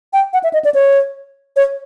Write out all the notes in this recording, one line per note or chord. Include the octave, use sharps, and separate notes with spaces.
G5
F#5
E5
D#5
D5
C#5
C#5